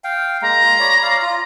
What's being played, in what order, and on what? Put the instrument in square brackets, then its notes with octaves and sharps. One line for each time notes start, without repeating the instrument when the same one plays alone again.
[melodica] F5 G5
[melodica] G#3 A#3 [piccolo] A#5
[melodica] F4 C6
C#5 D5 B5
D5 F5
F4